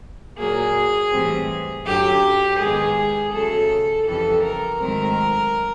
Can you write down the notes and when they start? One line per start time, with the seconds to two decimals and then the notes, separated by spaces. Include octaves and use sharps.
0.37 A#2 F#3 A#3 G#4
1.11 A2 E3 G3 C4
1.85 F#2 D3 F#3 G4
2.59 G#2 D#3 G#3 B3 G#4
3.32 C#3 F#3 A3 A4
4.06 F2 C#3 E3 G3 A4
4.43 A#4
4.80 G#2 D#3 F#3 A3 C4 A#4